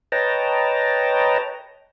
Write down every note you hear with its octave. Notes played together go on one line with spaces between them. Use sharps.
B4 C#5 D#5 G5 A5 A#5